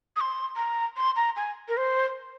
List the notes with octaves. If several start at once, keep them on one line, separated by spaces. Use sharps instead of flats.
D#6
C6
A#5
C6
A#5
G#5
A#4
C5